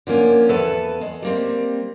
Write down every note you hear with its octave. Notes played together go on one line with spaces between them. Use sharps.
D3 F3 A#3 C#4
E2 B3 A4 B4 A5
G#3
G3 A#3 C4